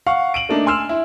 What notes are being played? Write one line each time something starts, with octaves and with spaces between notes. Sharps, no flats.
F5 F#5 C#6
D7 D#7 F#7
A3 A#3 D4 D#4
G#5 C6 E6 F6 E7
E4